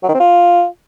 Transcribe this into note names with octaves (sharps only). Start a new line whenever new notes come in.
F#3
D#3
C4
F4